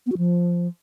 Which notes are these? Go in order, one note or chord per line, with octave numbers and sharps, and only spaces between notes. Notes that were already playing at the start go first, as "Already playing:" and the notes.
B3
F#4
F3